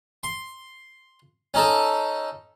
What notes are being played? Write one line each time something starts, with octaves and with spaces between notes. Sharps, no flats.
C6
C#4 D#4 A4